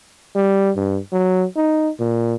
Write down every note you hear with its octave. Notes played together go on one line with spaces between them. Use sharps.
G3
G2
F#3
D#4
A#2